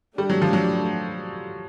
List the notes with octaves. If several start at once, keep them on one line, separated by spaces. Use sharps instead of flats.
G3 A3 D4 G4
F#3
F3
F#3